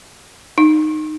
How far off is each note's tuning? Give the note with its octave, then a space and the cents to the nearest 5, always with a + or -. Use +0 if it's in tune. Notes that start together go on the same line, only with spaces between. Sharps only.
D#4 -15